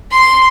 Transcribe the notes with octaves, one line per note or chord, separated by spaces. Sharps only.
C6